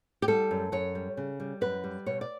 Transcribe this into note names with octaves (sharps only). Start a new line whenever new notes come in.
G4
G3 A4
F#2
F#2 C#5
G3
C#3
G3
F#2 B4
G3
B2 C#5
D5